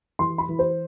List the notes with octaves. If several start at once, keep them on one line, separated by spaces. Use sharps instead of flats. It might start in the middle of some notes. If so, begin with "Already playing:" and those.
E3 C6
B5
E3
C5